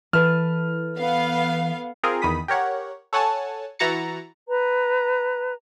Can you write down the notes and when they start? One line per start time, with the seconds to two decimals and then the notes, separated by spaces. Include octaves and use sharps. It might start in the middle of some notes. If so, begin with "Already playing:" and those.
0.13 E3 A4 B4 A5 F6
0.97 B3 F5
2.03 C4 F4 G#4 A#4
2.22 E2 D#3 B5 D#6 B6
2.48 G4 A#4 C#5 F#5
3.13 A4 C#5 F#5 G#5 A5
3.79 E3 E4 F#4 A#5 A6 C#7
4.48 B4 A#5